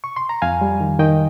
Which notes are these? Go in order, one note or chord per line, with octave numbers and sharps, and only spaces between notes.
C#6
C6
A#5
F2 F5 G#5
G3
D#3
D#3 D#5 G5